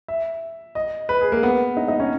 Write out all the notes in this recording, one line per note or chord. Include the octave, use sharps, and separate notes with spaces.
E5
D#5
B4
G#4
A#3
B3
D#4
D#4
C#4